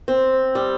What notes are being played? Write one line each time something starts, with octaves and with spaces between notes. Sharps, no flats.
C4
G3